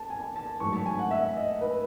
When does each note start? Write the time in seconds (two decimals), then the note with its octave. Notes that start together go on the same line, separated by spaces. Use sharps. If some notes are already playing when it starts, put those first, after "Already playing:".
Already playing: A5
0.10 G#5
0.36 A5
0.60 A1 G#2 F#3 C#6
0.73 A5
0.86 G#5
0.99 F#5
1.11 E5
1.36 D#5
1.61 B4